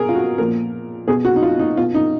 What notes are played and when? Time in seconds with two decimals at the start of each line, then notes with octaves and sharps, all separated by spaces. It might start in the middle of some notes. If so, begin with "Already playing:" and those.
Already playing: B2 G#4 A#4
0.09 F4
0.15 F#4
0.38 A#2 F3 A#4
1.08 B2 G#4
1.25 F#4
1.36 D#4
1.43 F4
1.59 D#4
1.77 B2 F4
1.94 D#4